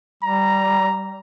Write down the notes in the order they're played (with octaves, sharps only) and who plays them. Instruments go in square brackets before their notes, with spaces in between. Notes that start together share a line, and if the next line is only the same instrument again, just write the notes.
[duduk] G3 [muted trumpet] A#5